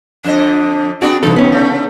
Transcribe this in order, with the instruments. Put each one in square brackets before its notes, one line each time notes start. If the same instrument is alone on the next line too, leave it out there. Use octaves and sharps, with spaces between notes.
[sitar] F2 D3 D#5 [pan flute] D4
[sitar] B3 D4 G#4 [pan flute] C4 [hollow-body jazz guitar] F#4
[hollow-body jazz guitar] C2 A4 [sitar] E3 B3 [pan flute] D#4
[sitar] B2 [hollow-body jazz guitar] B3 C#4
[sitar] C#3 A3